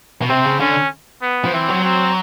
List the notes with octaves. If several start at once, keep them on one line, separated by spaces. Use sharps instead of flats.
B2
C3 C4
C#3
D3 C#4
B3
F3
E3 C4
F#3
C4